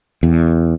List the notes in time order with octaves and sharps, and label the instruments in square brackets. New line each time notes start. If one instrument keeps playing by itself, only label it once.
[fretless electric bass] E2